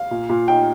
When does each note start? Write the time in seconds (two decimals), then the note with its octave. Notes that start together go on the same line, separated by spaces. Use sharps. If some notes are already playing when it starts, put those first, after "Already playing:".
Already playing: F5
0.11 A#2
0.29 A#2
0.48 D#4 G5